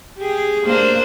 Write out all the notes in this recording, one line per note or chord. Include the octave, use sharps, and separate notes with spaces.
G4 G#4
A#3 D4 C5